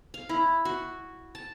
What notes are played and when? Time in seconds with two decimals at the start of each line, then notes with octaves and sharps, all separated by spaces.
0.14 F5
0.29 E4
0.65 F#4
1.35 A5